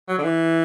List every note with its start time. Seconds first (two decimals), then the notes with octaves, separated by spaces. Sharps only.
0.08 F#3
0.18 D3
0.23 E3